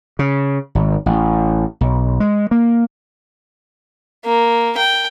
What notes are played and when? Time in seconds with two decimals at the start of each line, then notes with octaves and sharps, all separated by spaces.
0.19 C#3
0.75 G#1
1.06 A1
1.81 B1
2.20 G#3
2.51 A#3
4.25 A#3
4.77 G5